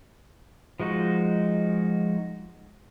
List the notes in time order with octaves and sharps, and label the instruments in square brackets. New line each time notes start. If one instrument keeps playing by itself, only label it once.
[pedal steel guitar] F3 G#3 D#4 F#4